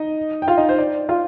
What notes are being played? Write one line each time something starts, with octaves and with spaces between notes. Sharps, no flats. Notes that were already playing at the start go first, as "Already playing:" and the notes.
Already playing: D#4 D#5
G5
F4 F5
D#4 D#5
C5
D5
F4 F5